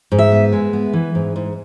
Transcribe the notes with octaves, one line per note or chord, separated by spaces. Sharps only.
G#2
E5
B3
G#3
B3
E3
G#2
G#2